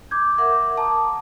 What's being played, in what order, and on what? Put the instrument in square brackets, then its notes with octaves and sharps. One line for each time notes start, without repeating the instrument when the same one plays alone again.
[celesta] D6 G6 G#6
[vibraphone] A#4 E5 F#5 [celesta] D6
[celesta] A5 [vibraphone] A#5 D6 D#6